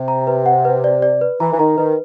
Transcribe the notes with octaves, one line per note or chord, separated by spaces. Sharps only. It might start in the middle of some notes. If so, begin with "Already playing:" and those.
Already playing: C3
A#5
B4
F#5
B4
D5
D5
B4
E3 A#5
E3
D#3 A#5
D#3 B4